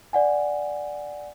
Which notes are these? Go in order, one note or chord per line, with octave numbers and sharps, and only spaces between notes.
D5 F#5 G#5